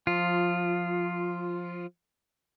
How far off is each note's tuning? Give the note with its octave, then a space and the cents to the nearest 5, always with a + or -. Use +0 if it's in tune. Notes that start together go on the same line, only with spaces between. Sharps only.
F3 +15 F4 +0